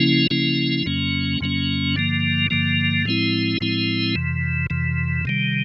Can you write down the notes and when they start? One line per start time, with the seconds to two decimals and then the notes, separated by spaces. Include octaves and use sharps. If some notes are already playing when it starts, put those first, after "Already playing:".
Already playing: C#3 F3 A#3 C#4 E4
0.30 C#3 F3 A#3 C#4 E4
0.86 F2 C#3 F#3 A#3 C#4
1.41 F2 C#3 F#3 A#3 C#4
1.96 G2 D3 F3 A#3
2.50 G2 D3 F3 A#3
3.05 A2 F3 G#3 C4 E4
3.61 A2 F3 G#3 C4 E4
4.16 F2 C3 E3
4.70 F2 C3 E3
5.25 C3 D#3 G3